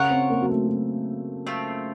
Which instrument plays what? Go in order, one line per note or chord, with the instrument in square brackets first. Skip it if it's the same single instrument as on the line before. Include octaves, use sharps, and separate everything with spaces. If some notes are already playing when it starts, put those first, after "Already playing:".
Already playing: [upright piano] C#3 [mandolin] F4 A#4 C#5 F#5
[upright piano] C4
A#3
F#3
A3
F#3
[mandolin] A3 C4 F4